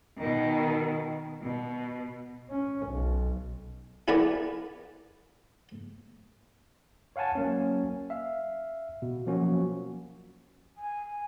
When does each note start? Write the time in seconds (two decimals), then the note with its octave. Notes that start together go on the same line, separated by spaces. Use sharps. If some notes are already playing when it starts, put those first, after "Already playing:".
0.18 B2 D#3
1.42 B2
2.50 C#4
2.88 B1
4.08 E4 G#4 A#4 B4 D5 F#5
7.16 C#5 F5 F#5 G#5 A5
7.35 F#3 A#3 C#4
8.10 E5 F5
9.02 B2
9.26 F3 F#3 A#3 C#4 F#4
10.78 G#5